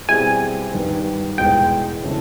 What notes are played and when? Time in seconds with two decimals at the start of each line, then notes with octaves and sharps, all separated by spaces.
0.09 B2 G3 C4 E4 G#4 G#5
0.73 G2 D#3 G3 B3
1.38 E2 B2 G#3 G5
2.03 C#3 E3 A3